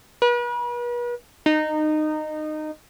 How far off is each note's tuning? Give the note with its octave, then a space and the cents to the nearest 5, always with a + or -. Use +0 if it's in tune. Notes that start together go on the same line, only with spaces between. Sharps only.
B4 -40
D#4 -20